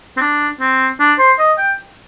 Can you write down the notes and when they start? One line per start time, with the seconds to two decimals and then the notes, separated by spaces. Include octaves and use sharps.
0.17 C4
0.21 D4
0.60 C4
1.00 D4
1.19 C5
1.39 D#5
1.58 G5